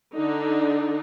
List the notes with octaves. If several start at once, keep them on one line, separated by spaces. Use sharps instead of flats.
D3 D4 D#4